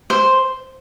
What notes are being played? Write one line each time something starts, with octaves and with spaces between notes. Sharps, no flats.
C5